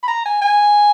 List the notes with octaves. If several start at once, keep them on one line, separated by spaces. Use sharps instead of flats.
B5
A#5
G#5
G#5